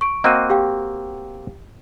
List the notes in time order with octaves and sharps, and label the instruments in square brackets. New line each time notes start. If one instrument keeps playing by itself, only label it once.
[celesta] C#6 D7
[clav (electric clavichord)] A#3 C4 F#4 [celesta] D#5 F#6 D#7
[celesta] G4 F5 G5